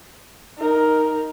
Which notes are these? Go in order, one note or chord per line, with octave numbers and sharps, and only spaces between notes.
D#4 A#4